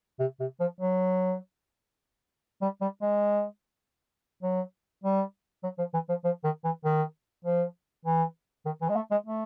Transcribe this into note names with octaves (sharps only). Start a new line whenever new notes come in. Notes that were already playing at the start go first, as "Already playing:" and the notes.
C3
C3
F3
F#3
G3
G3
G#3
F#3
G3
F#3
F3
E3
F3
F3
D#3
E3
D#3
F3
E3
D#3
E3
G#3
A3
G#3
A3